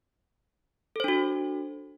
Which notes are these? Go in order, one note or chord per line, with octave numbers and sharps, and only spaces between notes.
D4 F#4 A4 C5